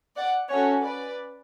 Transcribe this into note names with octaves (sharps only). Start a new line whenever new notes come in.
D5 F#5
C#4 F#4 A4 C#5
B4 D5